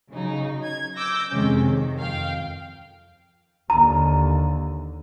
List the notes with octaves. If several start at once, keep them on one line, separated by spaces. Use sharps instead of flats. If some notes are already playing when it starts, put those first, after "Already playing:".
C#3 F#3 D#4
G#6
D6 E6 G6 A#6
F2 C3 D#3 G#3 C#4
D#3
F2 F5 G5
D#2 D3 A#5